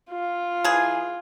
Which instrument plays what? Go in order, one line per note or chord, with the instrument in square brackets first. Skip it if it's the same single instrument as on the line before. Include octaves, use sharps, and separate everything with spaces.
[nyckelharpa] F4
[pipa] E3 G#4